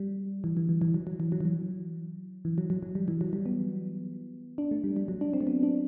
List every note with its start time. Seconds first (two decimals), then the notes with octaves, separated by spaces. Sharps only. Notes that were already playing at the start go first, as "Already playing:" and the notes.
Already playing: G3
0.44 E3
0.57 E3
0.69 E3
0.82 E3
0.94 F#3
1.07 F#3
1.20 E3
1.32 F#3
1.41 E3
1.45 F#3
2.45 E3
2.58 F#3
2.70 F#3
2.83 F#3
2.95 G3
3.08 E3
3.21 F#3
3.33 G3
3.46 B3
4.58 D4
4.71 A3
4.84 G3
4.96 G3
5.08 F#3
5.21 D4
5.33 C4
5.41 A3
5.47 B3
5.63 D4